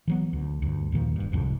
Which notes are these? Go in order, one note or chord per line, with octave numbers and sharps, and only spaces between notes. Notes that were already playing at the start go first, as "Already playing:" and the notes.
E3 F#3 B3
D2
D2 G2
D#2 A#2 D#3 F3
D#1 G2
D1 C2 F2 G#2